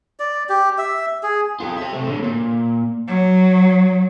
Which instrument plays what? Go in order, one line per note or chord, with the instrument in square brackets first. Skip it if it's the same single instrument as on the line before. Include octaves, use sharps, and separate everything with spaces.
[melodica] D5
G4
E5
G#4
[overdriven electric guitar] F4 A4
C5 E5
C3 A3
A2 D3
A#2
[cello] F#3